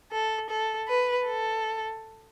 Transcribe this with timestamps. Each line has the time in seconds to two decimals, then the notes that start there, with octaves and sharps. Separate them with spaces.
0.12 A4
0.50 A4
0.88 B4
1.27 A4